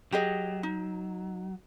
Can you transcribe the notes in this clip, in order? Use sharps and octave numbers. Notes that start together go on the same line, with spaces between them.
F#3 G4 G#4 D#5
D#4